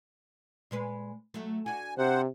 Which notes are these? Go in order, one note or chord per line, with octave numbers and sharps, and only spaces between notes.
A#2 G#3 B4
F#3 A3
D4 F#4 G#5
C3 C5 F#5